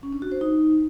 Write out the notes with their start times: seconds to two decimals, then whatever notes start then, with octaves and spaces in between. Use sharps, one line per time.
0.03 C#4
0.13 D4
0.22 F#4
0.32 C5
0.41 D#4